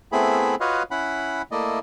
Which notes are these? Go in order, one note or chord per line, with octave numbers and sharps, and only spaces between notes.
A3 B3 C4 E4 G#4 B5
F4 F#4 B4 C#5 D#5 F5
C#4 E4 F#5 B5
A3 A#3 E4 D5 D#5